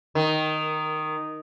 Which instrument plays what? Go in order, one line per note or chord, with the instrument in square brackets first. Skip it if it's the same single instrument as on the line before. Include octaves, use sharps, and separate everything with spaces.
[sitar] D#3